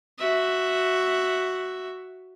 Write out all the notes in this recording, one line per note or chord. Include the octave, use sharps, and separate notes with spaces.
F#4 E5